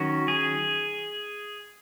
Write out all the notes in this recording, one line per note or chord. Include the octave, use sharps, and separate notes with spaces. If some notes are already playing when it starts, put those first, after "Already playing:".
Already playing: D#3 F#3 C#4 F#4
G#4